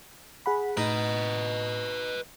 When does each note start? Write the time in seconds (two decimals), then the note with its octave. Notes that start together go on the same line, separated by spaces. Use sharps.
0.46 G#4 F#5 B5
0.77 A2 D#4 B4 D#5